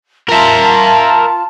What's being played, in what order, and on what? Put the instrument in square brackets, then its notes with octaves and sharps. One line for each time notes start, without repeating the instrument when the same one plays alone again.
[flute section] F4 A5 [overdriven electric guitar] A#4 E5